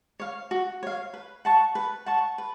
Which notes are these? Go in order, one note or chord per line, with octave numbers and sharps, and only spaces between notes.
C#5 F5
F#4
C#5 F5
B4
F#5 A5 C#6
B4
F#5 A5 C#6
B4